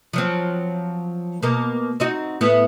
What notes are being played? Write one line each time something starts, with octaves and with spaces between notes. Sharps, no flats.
F3 F#3 C4
B2 A#3
C4 D#4 F#4
A2 B3 E4